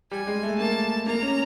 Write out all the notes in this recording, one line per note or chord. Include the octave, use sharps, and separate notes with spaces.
G3 G#5
G#3
A3
A#3 A5
A#3 A#5
C#4